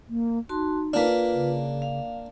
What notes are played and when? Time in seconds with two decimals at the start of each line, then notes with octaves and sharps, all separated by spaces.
0.09 A#3
0.49 D#4 F#4 A5 C6
0.93 A#3 D4 F4 B4
1.33 C#3
1.82 F5